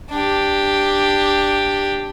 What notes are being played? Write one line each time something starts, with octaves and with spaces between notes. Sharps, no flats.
D4 G4